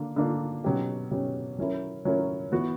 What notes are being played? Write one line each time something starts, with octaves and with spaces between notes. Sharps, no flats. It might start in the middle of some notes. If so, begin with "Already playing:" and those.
Already playing: D3 A#3 D4
D3 A#3 D4
B2 F#3 C#4 G4
B2 F#3 C#4 G4
F#3 C#4 E4 A#4
F#3 C#4 E4 A#4
E3 B3 F#4